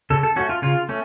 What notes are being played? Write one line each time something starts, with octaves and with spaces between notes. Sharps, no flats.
C#3 A4
A4
A3 C#4 F#4
F4
C#3 F4
A3 C#4